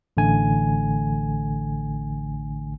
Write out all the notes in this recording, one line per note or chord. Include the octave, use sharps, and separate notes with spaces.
A1 D3 A3 G#5